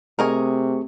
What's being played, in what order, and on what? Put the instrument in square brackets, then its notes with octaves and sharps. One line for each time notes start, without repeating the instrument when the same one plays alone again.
[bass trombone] C3 [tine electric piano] A3 G#4 C#6 [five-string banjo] A#4 D#5 G#5